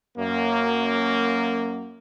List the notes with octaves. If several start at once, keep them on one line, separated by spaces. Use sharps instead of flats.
F#2 A#3